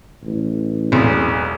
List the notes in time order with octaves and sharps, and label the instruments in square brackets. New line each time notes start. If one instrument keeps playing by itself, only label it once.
[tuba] A1
[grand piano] E1 B1